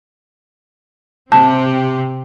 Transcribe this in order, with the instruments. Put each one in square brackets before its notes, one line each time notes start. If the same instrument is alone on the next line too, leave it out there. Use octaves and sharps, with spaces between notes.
[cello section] C3 C4 G4 [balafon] A5